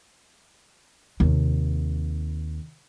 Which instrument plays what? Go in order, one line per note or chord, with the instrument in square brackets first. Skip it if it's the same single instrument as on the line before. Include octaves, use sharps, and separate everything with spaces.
[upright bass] D#2 C3